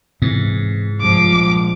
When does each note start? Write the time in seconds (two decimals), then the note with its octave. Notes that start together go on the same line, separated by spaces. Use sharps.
0.22 G#2 C3 E3
1.02 C2 G2 F3 G#3 D6
1.32 A#1 G#3